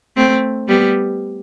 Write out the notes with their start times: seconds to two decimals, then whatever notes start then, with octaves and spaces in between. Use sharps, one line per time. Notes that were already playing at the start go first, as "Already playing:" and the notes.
0.16 A3 C4
0.68 G3 B3